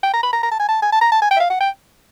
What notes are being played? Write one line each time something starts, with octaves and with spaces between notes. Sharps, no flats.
G5
A#5
B5
A#5
A#5
A5
G#5
A5
G#5
A5
A#5
A5
G#5
G5
E5
F5
F#5
G5